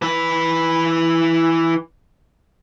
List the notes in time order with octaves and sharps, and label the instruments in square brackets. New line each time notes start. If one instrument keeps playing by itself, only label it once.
[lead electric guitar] E3 B4